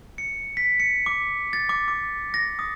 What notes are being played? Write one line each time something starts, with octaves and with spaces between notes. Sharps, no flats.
C#7
B6
C#7
D6
A6
D6
D6
A#6
D#6